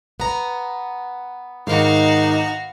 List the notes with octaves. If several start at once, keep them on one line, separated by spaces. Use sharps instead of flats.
B3 A#5
G#2 D#3 D#4 F#4 F5